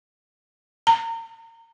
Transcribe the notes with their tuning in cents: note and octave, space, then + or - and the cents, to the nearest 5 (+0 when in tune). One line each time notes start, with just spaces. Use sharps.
A#5 -35